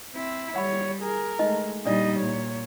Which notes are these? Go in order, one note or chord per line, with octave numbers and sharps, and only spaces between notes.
C4 E4
G3 C#5 F#5 B5
G#4 A#4
G#3 A3 D#4 D#5
A#2 G3 D4 D#4 D5 D#5
A#2 C#5